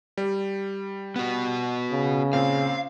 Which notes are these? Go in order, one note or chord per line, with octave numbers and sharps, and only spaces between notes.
G3
B3 F#4
C#3
A#2 C4 F5